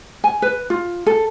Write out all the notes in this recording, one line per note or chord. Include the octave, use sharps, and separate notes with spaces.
G#5
B4
F4
A4